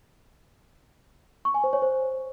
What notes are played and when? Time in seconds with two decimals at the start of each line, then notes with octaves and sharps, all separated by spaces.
1.45 C#6
1.54 G#5
1.64 C5
1.73 C#5
1.82 C5